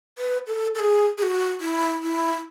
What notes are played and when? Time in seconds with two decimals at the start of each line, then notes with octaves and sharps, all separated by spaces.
0.18 B4
0.47 A4
0.75 A4
0.79 G#4
1.18 G#4
1.22 F#4
1.60 E4
2.02 E4